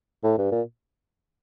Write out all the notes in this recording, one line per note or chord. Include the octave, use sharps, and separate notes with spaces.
A2
G2
A#2